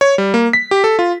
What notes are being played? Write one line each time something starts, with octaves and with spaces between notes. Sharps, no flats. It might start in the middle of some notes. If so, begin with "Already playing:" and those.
C#5
G3
A#3
B6
G4
A4
F4